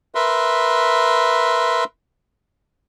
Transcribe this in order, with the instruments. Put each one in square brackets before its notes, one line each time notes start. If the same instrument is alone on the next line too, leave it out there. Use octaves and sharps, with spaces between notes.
[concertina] A#4 B4 E5 C6